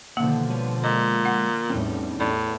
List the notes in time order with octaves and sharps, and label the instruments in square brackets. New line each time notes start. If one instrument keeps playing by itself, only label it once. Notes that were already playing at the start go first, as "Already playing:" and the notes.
[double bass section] B2 D3 F3 [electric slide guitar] D#3 F#5 [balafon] A#3
[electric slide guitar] G3 B4 C#5
[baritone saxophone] A#2 [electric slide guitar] G#3 [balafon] D#5
[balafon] F#5
[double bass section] E2 A2 G3 [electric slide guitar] C4 C#4 D#4
[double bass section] E2 [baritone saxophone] A2 [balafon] D5